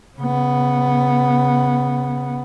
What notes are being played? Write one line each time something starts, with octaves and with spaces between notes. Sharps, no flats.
C#3 B3